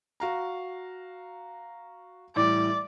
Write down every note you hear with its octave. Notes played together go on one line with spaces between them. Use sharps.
F#4 F5 A#5
A2 E3 G3 D5